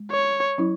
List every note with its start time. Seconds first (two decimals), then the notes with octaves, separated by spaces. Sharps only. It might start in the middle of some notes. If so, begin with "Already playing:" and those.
Already playing: G#3
0.12 C#5
0.58 F#3 C#4 E4